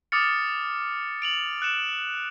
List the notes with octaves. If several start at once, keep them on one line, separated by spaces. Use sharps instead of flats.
D6 D#6 F6 A6 C#7
D7 F7 F#7
F#6 C#7 E7